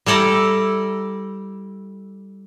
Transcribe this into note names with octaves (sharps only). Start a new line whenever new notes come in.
G3 E4 A4 D5 A#5